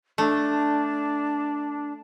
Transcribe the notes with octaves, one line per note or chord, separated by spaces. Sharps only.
A3 D4